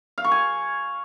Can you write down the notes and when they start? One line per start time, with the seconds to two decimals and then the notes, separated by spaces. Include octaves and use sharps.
0.18 F5
0.24 C#6
0.31 G#5